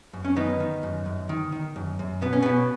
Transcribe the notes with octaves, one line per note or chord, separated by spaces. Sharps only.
F#2
C#4
D#3 B3 D#4
D#3
F#2
F#2
D#3
D#3
F#2
F#2
B2 B3
C#4
B2 B3